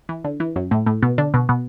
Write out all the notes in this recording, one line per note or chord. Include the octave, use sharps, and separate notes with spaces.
E3
D3
E3
F#2 F#3
A2 A3
A2 A3
B2 B3
D3 D4
B2 B3
B2 B3